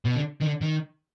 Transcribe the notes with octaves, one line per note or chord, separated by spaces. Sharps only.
B2
D3
D#3
D3
D#3